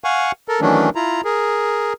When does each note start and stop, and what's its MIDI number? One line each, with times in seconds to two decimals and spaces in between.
0.04 0.32 77
0.04 0.32 78
0.04 0.32 80
0.04 0.32 85
0.48 0.61 69
0.48 0.61 70
0.61 0.89 51
0.61 0.89 52
0.61 0.89 54
0.61 0.89 57
0.61 0.89 61
0.61 0.89 62
0.95 1.21 64
0.95 1.21 65
0.95 1.21 82
1.24 1.93 68
1.24 1.93 70